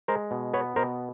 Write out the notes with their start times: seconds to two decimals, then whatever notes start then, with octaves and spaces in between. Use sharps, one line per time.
0.08 G#3 A#4 C5
0.31 B2
0.53 B3 B4 C#5
0.76 B2 A#4 C5